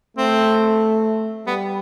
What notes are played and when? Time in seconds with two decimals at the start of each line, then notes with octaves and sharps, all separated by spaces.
0.17 A3 C4
1.47 G3 B3